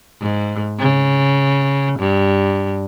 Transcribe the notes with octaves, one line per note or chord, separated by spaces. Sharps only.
G#2
C#3
G2